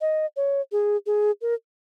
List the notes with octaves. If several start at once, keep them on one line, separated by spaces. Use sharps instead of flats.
D#5
C#5
G#4
G#4
A#4